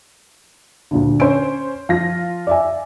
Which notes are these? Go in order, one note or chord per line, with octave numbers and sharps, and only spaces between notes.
D2 A#2 D3
C#4 C5 C#5 D7
F3 F4 A#6
D5 E5 G#5